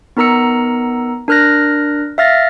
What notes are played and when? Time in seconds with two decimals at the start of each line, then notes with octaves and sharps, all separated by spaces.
0.17 B3 D#4 A#4 A#5 E6 C#7
1.28 D4 A#4 F6 F#6 A#6
2.18 E5 F5 F6 A6 A#6